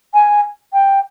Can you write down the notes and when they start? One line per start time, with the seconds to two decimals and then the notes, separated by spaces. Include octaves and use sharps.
0.14 G#5
0.73 G5